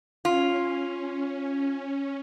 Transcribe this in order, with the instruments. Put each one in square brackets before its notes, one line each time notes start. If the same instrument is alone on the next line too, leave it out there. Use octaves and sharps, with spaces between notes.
[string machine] C#4 [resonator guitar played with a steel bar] F4